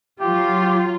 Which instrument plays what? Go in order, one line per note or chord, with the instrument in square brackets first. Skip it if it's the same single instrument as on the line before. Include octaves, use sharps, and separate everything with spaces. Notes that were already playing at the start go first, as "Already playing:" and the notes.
[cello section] F#3 F4 [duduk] G4